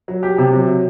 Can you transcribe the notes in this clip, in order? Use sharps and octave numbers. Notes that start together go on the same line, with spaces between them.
F#3
G4
C3
F#3